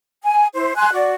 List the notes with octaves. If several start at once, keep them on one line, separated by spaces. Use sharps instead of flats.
G#5
E4 C5
G#5 C6 F#6
F#4 D5